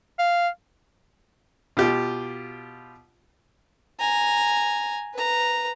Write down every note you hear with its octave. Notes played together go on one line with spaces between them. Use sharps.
F5
B2 F4 G4
G#5 A#5
B4 A#5